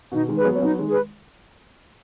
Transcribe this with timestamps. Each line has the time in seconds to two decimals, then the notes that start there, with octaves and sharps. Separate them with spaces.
0.12 B2 D#3 D#4
0.28 D#3 G#3
0.37 G#4 B4
0.45 F#3 B3
0.56 C#4
0.62 F#3 B3 D#4
0.79 D#3 G#3
0.87 G#4 B4